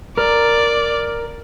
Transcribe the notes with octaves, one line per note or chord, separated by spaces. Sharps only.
A#4 D5